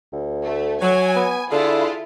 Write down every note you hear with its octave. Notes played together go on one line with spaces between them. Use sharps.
D2
A3
F#3 G#5
B3
D3 D4 E4 F4 G#4 A4